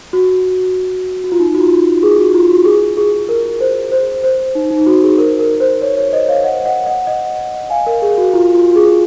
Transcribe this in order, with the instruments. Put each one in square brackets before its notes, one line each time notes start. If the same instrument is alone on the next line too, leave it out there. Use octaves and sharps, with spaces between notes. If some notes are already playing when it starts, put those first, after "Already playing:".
[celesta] F#4
F#4
F4
D#4
F#4
F4
G#4
F#4
F4
F#4
G#4
G#4
A#4
C5
C5
C5
D#4
D#4
F#4
G#4
A#4
A#4
C5
C#5
C#5
C5 D#5
C#5 F5
D#5 F#5
D#5 F#5
D#5 F#5
D#5 F#5
F5 G#5
A#4
G#4
F#4
F4
F4
G#4